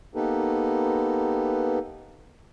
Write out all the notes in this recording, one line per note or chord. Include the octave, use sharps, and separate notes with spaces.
A#3 B3 D#4 G4 A4 B4